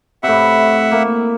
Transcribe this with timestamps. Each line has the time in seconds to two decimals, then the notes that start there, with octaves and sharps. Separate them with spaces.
0.23 A2 C3 E5 F#5
0.91 A#3